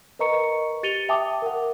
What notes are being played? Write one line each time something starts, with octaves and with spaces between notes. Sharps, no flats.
A#4 B4 D#5 A#5 C#6 C#7
G4 A6 C#7 D#7 F7 G7
E5 G5 A5 D6 D#6
A#4 F#5